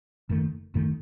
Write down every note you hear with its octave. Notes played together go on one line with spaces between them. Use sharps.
F#1 F#2 D#3 A3
G1 F#2 D#3 A3